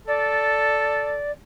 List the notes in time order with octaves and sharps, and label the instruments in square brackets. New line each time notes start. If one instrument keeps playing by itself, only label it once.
[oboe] A4 [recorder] D5